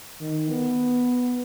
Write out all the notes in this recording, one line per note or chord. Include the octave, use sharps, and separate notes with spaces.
D#3
B3